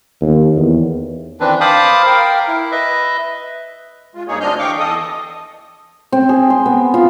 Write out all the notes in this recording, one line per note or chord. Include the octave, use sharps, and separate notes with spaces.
D#2
E2
D#3 E3 C4 D4 B4
C5 F5 A5 B5 D6 D#6
A#4 F5 G5
E4
B4 D#5 E5
G#3 F4
G2 A#3 D#4 G#4 C#5
D2 C4 D4 D#5 F6 G6
E3 F5 G5 C#6 D6
E2 A4 D#5 D#6
C4
G#4
C6
B3
F4